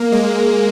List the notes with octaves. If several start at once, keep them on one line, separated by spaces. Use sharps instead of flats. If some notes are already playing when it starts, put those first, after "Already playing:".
Already playing: A#3
G#3